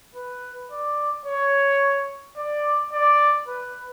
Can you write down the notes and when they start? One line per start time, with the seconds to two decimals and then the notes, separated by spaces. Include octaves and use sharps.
0.15 B4
0.71 D5
1.26 C#5
2.37 D5
2.93 D5
3.47 B4